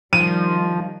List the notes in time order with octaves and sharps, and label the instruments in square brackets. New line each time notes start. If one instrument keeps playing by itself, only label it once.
[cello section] D#3 G3 [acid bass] F3 [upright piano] D#7